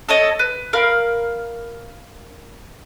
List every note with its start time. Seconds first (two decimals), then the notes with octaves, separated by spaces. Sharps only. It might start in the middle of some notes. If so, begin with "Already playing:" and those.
0.09 A4 C#5 D#5
0.39 B4
0.73 A#4 F5 B5